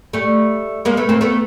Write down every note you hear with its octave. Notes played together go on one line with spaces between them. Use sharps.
G3 A3
G#3 A#3
A3 B3
A#3 C4
A3 B3